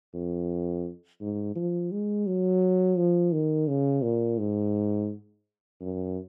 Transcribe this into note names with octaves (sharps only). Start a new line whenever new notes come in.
F2
G#2
F3
G#3
F#3
F3
D#3
C#3
A#2
G#2
F#2